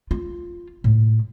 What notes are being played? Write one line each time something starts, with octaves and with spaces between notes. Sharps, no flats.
F4
A2